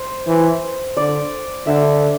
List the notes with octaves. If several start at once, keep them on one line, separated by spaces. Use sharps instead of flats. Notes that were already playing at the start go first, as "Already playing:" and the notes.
Already playing: C5
E3
D3 D5
D3 E5